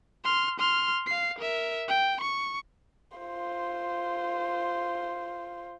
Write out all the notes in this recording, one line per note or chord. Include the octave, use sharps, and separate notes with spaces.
C6 F6
C6 F6
F5 C7
A#4 E5
G5
C#6
F4 C5